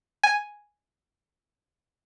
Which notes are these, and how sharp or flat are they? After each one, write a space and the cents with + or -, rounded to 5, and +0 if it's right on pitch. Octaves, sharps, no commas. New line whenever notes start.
G#5 +0